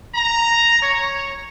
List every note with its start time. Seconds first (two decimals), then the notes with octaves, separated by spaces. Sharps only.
0.15 A#5
0.82 C#5